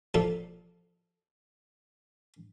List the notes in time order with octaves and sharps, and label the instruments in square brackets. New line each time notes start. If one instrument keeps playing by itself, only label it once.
[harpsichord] A#2 F3 A4